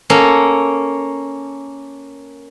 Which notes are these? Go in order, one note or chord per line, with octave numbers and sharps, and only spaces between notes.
A#3 C#4 A4